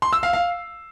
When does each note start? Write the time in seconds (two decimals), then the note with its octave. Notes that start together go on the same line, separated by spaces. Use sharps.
0.02 C6
0.13 E6
0.23 F5
0.33 F5